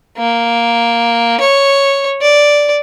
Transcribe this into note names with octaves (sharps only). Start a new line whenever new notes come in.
A#3
C#5
D5